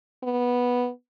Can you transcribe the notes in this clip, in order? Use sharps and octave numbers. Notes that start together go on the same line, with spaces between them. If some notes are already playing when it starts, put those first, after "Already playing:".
B3